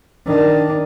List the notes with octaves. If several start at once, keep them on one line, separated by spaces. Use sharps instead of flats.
D#3 D4